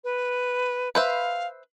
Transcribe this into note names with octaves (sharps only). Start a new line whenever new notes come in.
B4
B4 C5 E5 F5